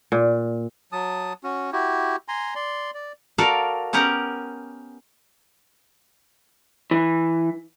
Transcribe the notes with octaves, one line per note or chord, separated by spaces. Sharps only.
A#2
F#3 A5 D#6
C#4 F#4
E4 F#4 G4
G#5 A#5 C6
D5 C6
D5
F#4 A4 A#4 D5 F5
B3 C#4 G4 A#4 F#5
E3